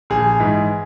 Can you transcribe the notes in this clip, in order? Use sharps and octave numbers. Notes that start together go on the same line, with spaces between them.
A#1 G#4
G#2 E3